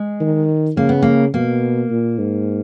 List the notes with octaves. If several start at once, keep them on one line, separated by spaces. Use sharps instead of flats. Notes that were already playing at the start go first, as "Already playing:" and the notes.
Already playing: G#3
D#3
C#3 A#3
B3
A#3
B2 A#3
A#2
G#2